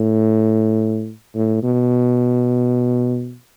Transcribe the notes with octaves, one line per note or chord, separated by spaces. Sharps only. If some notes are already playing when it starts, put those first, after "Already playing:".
Already playing: A2
A2
B2